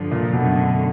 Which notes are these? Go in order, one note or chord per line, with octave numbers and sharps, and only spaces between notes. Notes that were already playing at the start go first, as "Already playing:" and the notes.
Already playing: G2 D3 F3
A#2
F#2 B2 D3 F#3 A3